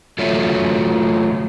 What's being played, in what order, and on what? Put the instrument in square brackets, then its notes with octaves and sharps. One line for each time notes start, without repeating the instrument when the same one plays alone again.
[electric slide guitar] F#3 A3 F4 F#4 C#5 E5